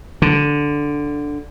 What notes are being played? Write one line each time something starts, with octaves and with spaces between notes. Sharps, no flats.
D3